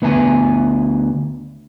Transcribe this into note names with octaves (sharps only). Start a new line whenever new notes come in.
D2 B3 B4 E5 F#5 G#5